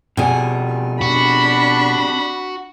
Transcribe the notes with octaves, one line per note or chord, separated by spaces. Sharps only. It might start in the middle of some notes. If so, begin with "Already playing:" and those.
F2 B2 G3 G#4 G#5
D4 F#4 B5